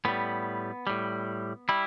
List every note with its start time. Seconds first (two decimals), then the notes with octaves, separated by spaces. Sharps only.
0.05 A2 G3 B3
0.87 A2 G3
1.69 G3 E4